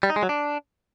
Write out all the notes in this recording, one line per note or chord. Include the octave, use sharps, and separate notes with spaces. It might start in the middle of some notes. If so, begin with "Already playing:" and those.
G3
D#4
G#3
F#3
D4